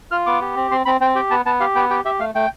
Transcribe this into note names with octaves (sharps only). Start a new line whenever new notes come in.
F4 F6
B3 D6
G4
C4
C4 C6
C4 B5
C4 G5
G4 G5
B3 A5
B3 A5
G4 F5
B3 G5
G4 G5
G4 E5
A3 F5
A3 G5